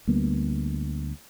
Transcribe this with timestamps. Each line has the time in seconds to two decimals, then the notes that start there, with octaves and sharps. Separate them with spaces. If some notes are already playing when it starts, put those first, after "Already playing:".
0.07 D2 G3 A#3 B3